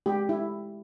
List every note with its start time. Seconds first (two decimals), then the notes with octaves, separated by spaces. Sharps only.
0.06 G#3 G4
0.29 E4